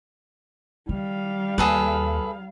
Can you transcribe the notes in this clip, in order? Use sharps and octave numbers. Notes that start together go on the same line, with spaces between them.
D#3 G3 F5
D#2 G#4 A4 B4